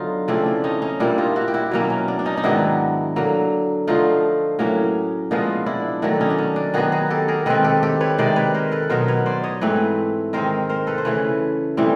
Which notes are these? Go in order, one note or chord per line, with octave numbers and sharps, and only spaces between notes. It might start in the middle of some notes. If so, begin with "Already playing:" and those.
Already playing: D3 F#3 B3 D#4 F4
C#3 F3 A3 C4 D4 E4
D4
C#4 D#4
C#4 D#4
A#2 G3 A#3 D4 E4
D#4 F4
E4 F#4
G4
E4 F#4
B2 F#3 A#3 C#4
C#4
D4
D4
C#4 D#4
D#4
G#2 D#3 F#3 B3 D4 E4
D3 F#3 A#3
D3 F3 A3 D#4 F4
A2 F#3 A#3 C#4
A#2 F3 G#3 B3 D#4 F4
D4 E4
D#3 F#3 A3 D4 E4
C#4 D#4
D4
C#4
D4
D#3 F#3 B3 F#4 G#4
F#4 G#4
G4 A4
G#4 A#4
D#3 G#3 C4 A4 B4
G4 A4
G4 A4
B4 C#5
C3 D#3 G#3 C5 D5
B4 C#5
A#4 C5
A4 B4
B2 F#3 B3 A#4 C5
B4 C#5
C5 D5
C#5 D#5
G#2 E3 A3 C4 B4 C#5
D#3 G#3 C4 A#4 C5
A#4 C5
A4 B4
C5
C#3 E3 A3 B4 C#5
A2 E3 G3 C4